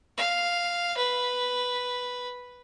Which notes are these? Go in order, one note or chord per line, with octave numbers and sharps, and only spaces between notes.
F5
B4